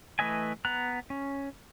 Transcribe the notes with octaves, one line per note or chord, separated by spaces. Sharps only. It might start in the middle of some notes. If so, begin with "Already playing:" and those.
E3 A3 B4 D#5 G#5
B3 A#5 F#6
C#4